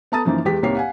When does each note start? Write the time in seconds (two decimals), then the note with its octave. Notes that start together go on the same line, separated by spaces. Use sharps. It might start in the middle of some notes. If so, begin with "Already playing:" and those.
0.12 B3 A4 A5 A#5 D#6 A6
0.25 F#2 E3 F3 A#3 D#4
0.45 E2 G#3 G4 B6
0.63 C2 G#2 A#3 G4 C#5 C7
0.75 F5 F#5 G#5